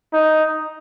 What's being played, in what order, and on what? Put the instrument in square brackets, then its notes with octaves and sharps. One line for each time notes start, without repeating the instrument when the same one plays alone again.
[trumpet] D#4